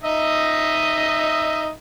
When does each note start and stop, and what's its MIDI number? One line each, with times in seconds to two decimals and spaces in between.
0.04 1.70 63
0.04 1.70 75
0.04 1.70 76